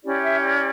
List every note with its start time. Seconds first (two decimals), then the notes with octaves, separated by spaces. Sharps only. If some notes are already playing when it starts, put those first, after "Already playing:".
0.03 C#4 E4 G4 D5
0.22 E5
0.41 D5